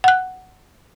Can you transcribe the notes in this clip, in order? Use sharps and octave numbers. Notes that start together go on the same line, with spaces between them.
F#5 F#6